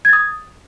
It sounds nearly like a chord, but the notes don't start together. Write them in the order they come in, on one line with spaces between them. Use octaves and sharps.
G#6 A6 D#6